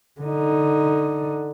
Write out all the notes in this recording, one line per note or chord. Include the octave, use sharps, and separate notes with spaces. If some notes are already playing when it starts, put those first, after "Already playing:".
D3 D#4